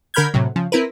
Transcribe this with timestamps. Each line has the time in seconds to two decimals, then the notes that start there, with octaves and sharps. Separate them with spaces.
0.14 D3 A#4 B5 F6 G6 G#6
0.34 A2 C3 F#3
0.56 C#3 F3
0.72 C4 E4 A#4 B4